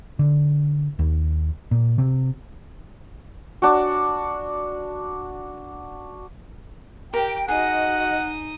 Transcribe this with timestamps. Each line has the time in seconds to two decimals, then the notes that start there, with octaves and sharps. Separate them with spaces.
0.19 D3
0.99 D#2
1.71 A#2
1.98 C3
3.62 D4 F#4
7.14 G4 A#4 G5
7.48 D#4 F#4 G#4 D#5 F#5 D#6